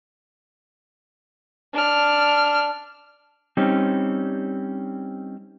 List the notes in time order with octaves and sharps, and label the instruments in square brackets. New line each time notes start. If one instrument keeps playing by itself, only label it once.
[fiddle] D4 F6
[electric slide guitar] G3 C4 C#4 D#4